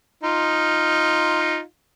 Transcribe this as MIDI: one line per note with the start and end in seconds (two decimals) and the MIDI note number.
0.24 1.61 63
0.24 1.61 65